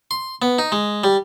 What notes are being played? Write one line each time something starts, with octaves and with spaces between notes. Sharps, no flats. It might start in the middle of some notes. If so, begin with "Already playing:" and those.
C6
B3
D#4
G#3
G3